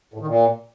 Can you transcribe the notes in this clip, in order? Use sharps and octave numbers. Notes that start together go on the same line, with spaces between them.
A2
D#3
A#2